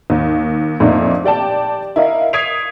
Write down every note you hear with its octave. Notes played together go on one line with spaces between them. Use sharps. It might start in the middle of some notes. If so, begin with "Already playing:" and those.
D#2
F2 A#2 D3 A3 D4 D#4
G4 D5 G5 A5
E4 A#4 D#5 F5
D#6 G#6 B6 C7 D7 F7